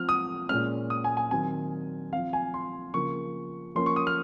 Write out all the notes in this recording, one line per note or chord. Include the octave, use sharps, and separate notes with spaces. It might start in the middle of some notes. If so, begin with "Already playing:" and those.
Already playing: F3 C4 F6
D#6
A#2 G#3 C#4 F6
D#6
G#5
G#5
D#3 F#3 C4 G#5
F3 C4 F5
G#5
C6
C#3 F3 A#3 C#6
F3 A#3 C#4 C6
C#6
D#6
F6